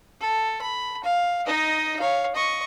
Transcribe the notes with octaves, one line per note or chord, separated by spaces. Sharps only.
A4
B5
F5
D#4 D#5
C#5 F5
D#5 C#6